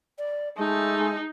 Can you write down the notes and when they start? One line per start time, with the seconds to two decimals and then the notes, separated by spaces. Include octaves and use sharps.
0.18 D5
0.58 G#3 A3 D#4